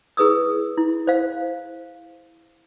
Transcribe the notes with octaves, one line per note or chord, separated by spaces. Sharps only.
E4 G#4 B4 D#6 E6
E4
C5 F5